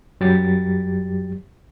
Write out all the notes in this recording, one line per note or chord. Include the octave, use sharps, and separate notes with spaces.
F#2 F#3 G3 G4 A6